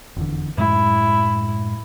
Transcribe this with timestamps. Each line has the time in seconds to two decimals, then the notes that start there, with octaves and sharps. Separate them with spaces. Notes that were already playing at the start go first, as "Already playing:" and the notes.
0.16 F1 E2 D3
0.58 F#2 A2 G#3 E4